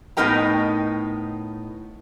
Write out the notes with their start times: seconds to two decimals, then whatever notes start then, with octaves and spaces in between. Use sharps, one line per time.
0.17 A2 B3 D#4 A#4 G5 A#5